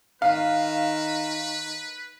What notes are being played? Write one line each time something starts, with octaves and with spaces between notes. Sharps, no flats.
D#3 B4 F5